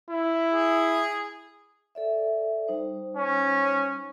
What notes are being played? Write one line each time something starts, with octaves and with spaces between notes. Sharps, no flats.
E4
G#4
A4 D5 E5
G3 D#4 C5
C#4